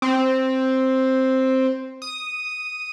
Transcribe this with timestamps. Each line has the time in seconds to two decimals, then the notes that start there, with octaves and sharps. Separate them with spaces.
0.02 C4
2.02 D#6